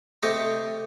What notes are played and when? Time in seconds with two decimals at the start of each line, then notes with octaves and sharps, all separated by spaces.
0.23 C3 A3 G4 D#5 A5 C#6